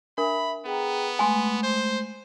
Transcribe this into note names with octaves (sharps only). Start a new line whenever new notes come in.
D4 A#4 E5 B5
B3 G#4 G5 A#5
G#3 A3 G#5 C6
C5